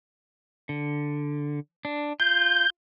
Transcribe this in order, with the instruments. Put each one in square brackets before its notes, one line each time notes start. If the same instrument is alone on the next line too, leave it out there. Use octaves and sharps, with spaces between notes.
[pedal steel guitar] D3
D4
[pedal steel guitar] F4 [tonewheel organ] G6